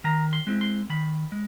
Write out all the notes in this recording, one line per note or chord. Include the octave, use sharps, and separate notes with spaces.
D#3 A#5
C6
G#3 C4 E4
C6
D#3 B5
G#3